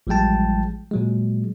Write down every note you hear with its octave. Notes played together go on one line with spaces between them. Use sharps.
A1 F3 G3 G#3 G5 A5
A#2 F#3 G#3